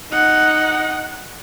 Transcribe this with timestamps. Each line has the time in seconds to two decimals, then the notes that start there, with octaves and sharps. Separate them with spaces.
0.11 D#4 F#5